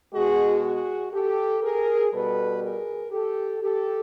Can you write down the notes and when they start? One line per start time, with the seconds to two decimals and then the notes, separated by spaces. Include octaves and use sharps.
0.13 B2 G#3 F#4 G#4
0.63 F#4 G#4
1.13 G4 A4
1.62 G#4 A#4
2.12 B2 G3 A4 B4
2.62 G#4 A#4
3.12 G4 A4
3.61 G4 A4